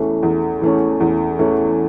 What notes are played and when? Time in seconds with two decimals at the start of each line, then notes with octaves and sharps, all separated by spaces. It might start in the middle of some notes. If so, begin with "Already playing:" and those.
Already playing: E2 E3 A3 C#4
0.23 E2
0.62 E3 A3 C#4
1.00 E2
1.39 E3 A3 C#4